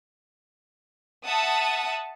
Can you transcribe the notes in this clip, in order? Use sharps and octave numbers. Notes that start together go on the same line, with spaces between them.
E5 F#5 A5 D#6